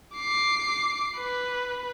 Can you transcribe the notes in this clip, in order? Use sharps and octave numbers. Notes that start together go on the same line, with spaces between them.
D6 C7
B4